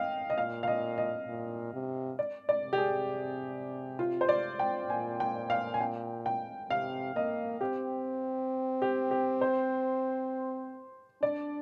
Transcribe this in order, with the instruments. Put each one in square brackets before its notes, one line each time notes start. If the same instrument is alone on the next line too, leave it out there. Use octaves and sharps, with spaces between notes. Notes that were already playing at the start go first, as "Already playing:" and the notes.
Already playing: [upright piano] D#5 F5 G5
D#5
[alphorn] A#2 [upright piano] F5
[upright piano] F5
D#5
D#5
[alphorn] A#2
C3
[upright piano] D5
D5
[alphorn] C3
[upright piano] G4
G#4
F4
C5
D5
G5
[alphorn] A#2 [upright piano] G#5
[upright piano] G5
F5
G#5
G5
G5
[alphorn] C3 [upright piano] F5
[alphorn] A#3 [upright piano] D#5
[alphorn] C4 [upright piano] G4
[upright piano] G4
G4
C5
[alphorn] D4 [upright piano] D5